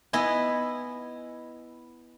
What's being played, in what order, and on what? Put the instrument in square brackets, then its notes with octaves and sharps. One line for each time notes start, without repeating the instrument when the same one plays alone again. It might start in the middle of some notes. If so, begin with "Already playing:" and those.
[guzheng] B3 E4 D#5 G#5